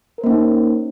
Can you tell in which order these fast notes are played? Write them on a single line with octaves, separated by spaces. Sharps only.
A#4 C5 A#3 C#4 D#4